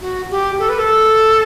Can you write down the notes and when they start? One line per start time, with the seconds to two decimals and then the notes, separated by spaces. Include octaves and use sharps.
0.01 F#4
0.31 G4
0.59 A4
0.69 B4
0.79 A4